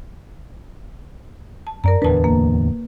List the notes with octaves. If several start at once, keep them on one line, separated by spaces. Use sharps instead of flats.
A5
F#2 A#4 D5 A#5
D1 E2 D4 B4 A5
A#3